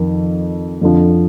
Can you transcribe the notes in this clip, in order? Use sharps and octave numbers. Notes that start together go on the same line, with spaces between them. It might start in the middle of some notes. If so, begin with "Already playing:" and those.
Already playing: F2 D#3
F2 D3 F3